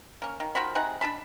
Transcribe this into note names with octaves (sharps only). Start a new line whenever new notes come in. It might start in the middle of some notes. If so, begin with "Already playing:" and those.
A#3 C#4
D#3
D#3 F3 F#4 B5
C3 D#4 G#4 F#5
D4 G#4 A5 B5